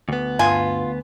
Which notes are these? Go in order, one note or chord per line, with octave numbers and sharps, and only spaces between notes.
D2 B3
G2 F4 G#5